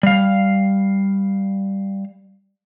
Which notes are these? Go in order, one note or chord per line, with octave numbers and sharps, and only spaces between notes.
G3 F5